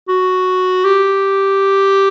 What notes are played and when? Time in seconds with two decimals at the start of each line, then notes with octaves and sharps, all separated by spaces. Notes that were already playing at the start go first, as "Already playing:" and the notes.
0.09 F#4
0.85 G4